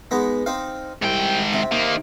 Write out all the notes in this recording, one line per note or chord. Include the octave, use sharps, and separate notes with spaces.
G#3 B3 D#4
C4 D#4 F5
C2 G#2 G5
C3
D#3 A#3